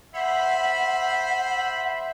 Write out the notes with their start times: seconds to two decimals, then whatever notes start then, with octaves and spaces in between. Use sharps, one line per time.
0.14 C5 E5 F#5 B5